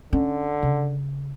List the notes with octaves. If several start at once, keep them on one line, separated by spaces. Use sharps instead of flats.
D3 C#4
C#3